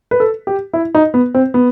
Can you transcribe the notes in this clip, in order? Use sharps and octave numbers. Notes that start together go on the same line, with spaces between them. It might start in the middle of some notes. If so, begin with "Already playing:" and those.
B4
A4
G4
E4
D#4
B3
C4
B3